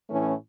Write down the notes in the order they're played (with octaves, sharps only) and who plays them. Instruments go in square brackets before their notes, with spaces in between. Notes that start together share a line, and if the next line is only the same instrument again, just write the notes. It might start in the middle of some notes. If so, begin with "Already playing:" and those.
[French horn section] A2 E3 A3 C#4